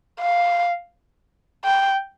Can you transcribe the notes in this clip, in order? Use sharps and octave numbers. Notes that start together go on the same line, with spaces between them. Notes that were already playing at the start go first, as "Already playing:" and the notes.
F5
G5